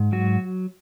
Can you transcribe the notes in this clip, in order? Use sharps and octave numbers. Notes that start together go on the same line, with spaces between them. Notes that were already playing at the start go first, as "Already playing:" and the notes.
Already playing: G#2
F#3 F#4